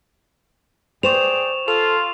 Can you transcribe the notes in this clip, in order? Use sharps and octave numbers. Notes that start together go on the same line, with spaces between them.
G#4 C5 D5 G5 C#6 E7 F7
F4 A4 F7